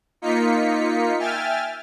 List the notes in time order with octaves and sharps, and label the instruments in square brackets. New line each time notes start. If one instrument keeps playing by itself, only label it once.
[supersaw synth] A#3 D#4 F4 B6 C#7
E5 G5 G#5 F6 A6